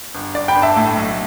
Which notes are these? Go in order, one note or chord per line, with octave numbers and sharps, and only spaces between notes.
G1
G1 D5
G5 B5
G1
E5 A5
A2
B1